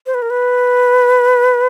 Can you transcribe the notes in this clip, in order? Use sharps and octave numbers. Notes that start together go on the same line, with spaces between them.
C5
B4
A#4
B4